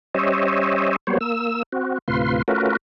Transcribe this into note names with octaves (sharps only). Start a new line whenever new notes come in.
G3 C#4 C5 C#5 D#5 E5
F#3 G3 A#3 B3 C5 C#5
A#3 E6
C4 F#4
D2 A2 C3 F4 B4 C6
A3 C#4 F4 F#4 A#4 B4